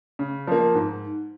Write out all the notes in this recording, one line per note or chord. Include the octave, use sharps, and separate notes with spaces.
C#3
F3 A#3
G#2